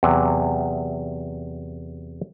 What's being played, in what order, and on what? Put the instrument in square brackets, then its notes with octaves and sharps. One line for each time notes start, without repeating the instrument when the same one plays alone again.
[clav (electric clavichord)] E2 C3 F#3